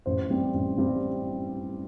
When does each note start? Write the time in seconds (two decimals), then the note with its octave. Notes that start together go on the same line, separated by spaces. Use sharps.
0.06 A1 C5
0.30 G2 G3 C4
0.54 A1
0.77 G2 G3 C4